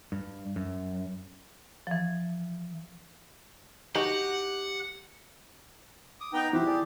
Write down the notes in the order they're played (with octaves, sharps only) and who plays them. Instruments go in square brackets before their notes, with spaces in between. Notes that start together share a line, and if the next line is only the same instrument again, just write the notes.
[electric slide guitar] G2
F#2
[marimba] E3 F3
[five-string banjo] D#4 F#4 [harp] G4 [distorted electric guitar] F#5
[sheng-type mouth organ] D6 D#6
[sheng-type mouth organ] B3 B4 A#5 [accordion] D#4 G5
[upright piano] E3 [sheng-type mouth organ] E4 F#4 C5 [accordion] G4
[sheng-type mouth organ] G#4 D5